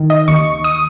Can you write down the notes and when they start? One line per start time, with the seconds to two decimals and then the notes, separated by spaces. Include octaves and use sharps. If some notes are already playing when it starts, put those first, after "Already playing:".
Already playing: D#3
0.10 D#5
0.28 D#2 C#6
0.64 D#6